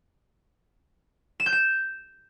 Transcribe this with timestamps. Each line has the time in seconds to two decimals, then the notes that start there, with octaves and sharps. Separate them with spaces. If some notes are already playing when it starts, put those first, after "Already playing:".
1.40 E7
1.46 G6
1.53 E7